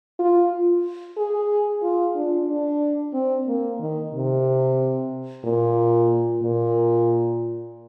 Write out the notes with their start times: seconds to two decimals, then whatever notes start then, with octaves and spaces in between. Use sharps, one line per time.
0.19 F4
1.17 G#4
1.83 F4
2.15 D4
2.48 D4
3.14 C4
3.48 A#3
3.80 D#3
4.13 C3
5.44 A#2
6.42 A#2